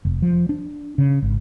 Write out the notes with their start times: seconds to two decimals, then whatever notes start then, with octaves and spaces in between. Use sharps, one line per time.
0.05 F1
0.22 F3
0.49 D4
0.98 C#3
1.22 G#1